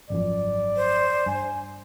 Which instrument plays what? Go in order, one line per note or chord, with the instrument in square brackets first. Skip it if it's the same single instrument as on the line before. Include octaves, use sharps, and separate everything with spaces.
[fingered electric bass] G#1 F#2 F3 [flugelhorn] D5
[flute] C5
[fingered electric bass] G2 [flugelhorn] G#5